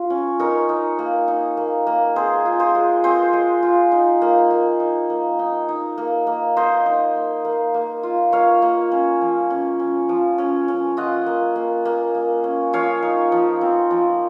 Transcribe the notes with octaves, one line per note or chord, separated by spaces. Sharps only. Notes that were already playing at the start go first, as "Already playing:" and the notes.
Already playing: F4
C#4
D#4 A#4 C#5
D#4
A#3
D#4
A#3
A#3
C4 G#4 C5
F4
G#4 C5
G#3
C4 G#4 C5
G#3
F4
D#4
A#3
A#3
D#4
A#3
D#4
D#4
A#3
A#3
A#3 C5 D#5
D#4
A#3
A#3
A#3
F4
A#3 C#5 F5
A#3
C#4
F3
C#4
C#4
F3
C#4
C#4
F4 D#5 F#5
A#3
A#3
A#3
A#3
C#4
F3 C#5 F5
D#4
F3
C4
F3